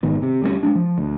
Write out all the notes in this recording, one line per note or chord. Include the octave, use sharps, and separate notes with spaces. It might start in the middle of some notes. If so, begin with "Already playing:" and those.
G#1 G#2 D#3 B3
C3
D2 G3 A#3 C#4
G#3 A#3 D4
F3
D2